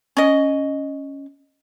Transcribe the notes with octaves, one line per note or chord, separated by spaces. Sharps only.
C#4 D#5